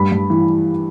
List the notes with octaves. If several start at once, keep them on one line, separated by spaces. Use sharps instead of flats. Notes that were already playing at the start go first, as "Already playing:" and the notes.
Already playing: G2 B5
G2
E3